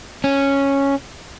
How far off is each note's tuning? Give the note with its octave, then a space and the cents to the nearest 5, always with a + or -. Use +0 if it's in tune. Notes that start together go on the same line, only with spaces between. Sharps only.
C#4 -5